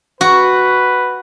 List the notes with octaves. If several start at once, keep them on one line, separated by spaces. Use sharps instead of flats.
F#4 B4